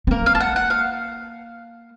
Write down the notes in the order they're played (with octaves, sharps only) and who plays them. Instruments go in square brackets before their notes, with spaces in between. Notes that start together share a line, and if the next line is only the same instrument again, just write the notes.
[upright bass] C4
[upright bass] A#3 [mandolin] A#4
[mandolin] F5
A5
F#5
F#5
F5